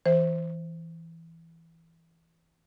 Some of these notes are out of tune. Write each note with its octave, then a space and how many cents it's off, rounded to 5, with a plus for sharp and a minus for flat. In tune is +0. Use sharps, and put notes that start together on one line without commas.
E3 +0 C5 +0